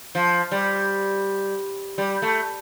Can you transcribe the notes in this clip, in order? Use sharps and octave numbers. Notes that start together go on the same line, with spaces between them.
F3
G3
G3
A3